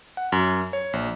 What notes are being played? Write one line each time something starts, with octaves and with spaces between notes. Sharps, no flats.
F#5
F#2
C#5
A#1